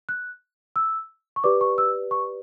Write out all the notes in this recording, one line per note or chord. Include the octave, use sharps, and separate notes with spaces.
F#6
E6
C#6
G4 B4 D5 D6
C#6
E6
C#6